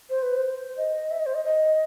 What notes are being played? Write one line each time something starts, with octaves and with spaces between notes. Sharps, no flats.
C5
B4
C5
D#5
E5
D#5
C5
D#5
D#5